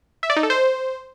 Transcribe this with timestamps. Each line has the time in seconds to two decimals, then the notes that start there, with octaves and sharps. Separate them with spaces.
0.23 E5
0.30 D5
0.36 D#4
0.43 A4
0.50 C5